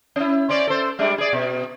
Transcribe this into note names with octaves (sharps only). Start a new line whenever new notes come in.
C#4 E4
C#4 C5 D5
A4 C5
G3 G#3 D4
G#4 D5
B2